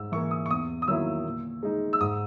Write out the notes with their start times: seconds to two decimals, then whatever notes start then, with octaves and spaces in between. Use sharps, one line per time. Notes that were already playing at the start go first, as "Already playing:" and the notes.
Already playing: G#2 E6
0.12 E3 A#3 C#6
0.31 D#6
0.46 C#6
0.50 E2 D#6
0.82 D#6
0.88 D#3 F#3 A#3 E4 E6
1.25 A#2
1.63 G#3 D#4
1.93 E6
2.00 G#2 D#6